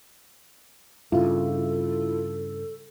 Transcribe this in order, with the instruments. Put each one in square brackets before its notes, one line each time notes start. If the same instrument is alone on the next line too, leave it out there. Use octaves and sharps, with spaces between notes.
[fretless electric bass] G2 C#3 [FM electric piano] E4 F4 [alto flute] A4